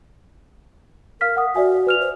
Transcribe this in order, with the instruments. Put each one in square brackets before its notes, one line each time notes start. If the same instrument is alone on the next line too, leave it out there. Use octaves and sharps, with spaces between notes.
[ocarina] A#4 [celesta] F5 F6 B6
[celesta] F#5 D#6
[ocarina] F#4 [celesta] D5 E5 G#5
[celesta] B4 F6 F7
[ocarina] C5